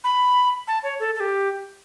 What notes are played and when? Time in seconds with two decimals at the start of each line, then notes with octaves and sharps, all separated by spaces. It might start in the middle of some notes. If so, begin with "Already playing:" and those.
0.04 B5
0.67 A5
0.83 C#5
1.00 A4
1.15 A4
1.20 G4